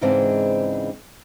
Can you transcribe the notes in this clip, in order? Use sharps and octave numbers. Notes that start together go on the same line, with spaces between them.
G#2 C#3 E3 G#3 C4 D4